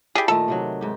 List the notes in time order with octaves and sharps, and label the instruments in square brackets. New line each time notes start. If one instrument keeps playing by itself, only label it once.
[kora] E4 D5 [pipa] G4 G#4
[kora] A#2 D#3 A3 [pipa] A4
[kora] C3 D#3 F#3
G#2 G4